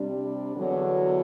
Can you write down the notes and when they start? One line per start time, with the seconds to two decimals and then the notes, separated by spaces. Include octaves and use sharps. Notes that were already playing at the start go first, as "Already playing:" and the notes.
Already playing: C3 G3 D4
0.56 E2 D3 F#3